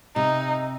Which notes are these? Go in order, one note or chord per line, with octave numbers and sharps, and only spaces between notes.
C3 D#4